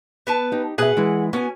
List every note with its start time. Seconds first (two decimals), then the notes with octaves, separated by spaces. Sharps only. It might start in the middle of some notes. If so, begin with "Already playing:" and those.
0.27 B3 B4 A5
0.52 D#4 G4
0.78 B2 G#4 B4 E5 F#5
0.97 E3 G#3 E4
1.33 B3 C#4 F#4 G#5